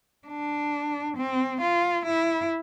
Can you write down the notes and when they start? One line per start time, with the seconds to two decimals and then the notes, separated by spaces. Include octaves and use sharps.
0.28 D4
1.17 C4
1.61 F4
2.05 E4